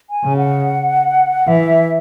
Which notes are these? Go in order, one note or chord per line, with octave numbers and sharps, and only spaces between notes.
G#5
C#3
F#5
E3 E5